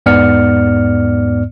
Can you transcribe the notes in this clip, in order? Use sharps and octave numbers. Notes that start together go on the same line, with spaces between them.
E2 G#2 B3 D5 F6 C#7